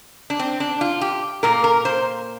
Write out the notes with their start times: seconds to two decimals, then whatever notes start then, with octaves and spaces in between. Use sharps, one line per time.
0.30 D4
0.39 C4
0.60 D4
0.81 F4
1.01 G4
1.43 A#2 A#3 A#4
1.64 A#4
1.85 C5